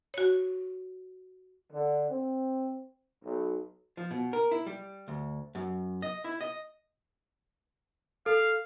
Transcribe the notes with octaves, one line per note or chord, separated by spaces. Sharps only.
F#4 C#5
D3
C4
B1
F3
B2
A#4
E4
G3
D2
F#2
D#5
E4
D#5
A4 F5